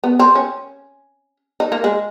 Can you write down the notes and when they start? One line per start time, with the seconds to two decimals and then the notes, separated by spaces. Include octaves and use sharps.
0.04 B3
0.19 C4
0.35 C#4
1.60 D#4
1.72 A#3
1.84 G#3